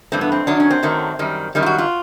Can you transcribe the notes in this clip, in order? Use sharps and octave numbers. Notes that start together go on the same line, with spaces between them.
G2 E3 A3 C4
B3
C4
F#2 D#3 F#3 A3 D4
C#4
C4
F#2 D#3 F#3 A3
F#2 D#3 G3
F#2 D#3 G3
F4
F#4
F4